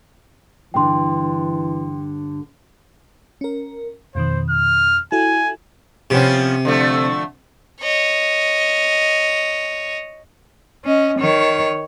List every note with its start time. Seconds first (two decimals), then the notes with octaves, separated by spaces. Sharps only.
0.74 G2 D3 E3 G5 C6
3.41 C#4 A#4
4.15 F2 B2 D#3 C5
4.50 F6
5.12 E4 F#4 A4 G#5
6.10 C3 F3 B3 C#4
6.65 D3 F3 A3
7.81 C#5 D#5
10.85 C#4 D#5
11.19 D#3 C#5